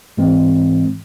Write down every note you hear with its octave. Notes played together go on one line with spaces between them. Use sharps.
G#2 E3 G#3 C4